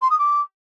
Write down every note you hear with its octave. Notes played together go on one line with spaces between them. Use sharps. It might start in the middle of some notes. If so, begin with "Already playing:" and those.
C6
D#6
D6